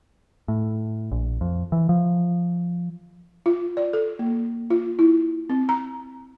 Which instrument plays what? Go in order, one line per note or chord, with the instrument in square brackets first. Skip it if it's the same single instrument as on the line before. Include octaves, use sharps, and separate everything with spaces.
[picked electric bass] A2
A#1
F2
E3
F3
[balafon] F4
D5
A4
A#3
F4
E4
C4
A#5